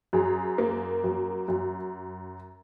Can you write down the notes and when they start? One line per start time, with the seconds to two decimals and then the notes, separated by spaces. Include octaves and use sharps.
0.13 F#2 G#4
0.58 A#3
1.04 F#2
1.48 F#2